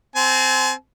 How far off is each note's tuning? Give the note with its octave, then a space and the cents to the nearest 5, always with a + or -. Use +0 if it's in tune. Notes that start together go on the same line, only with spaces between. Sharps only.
C4 -10 G#5 +40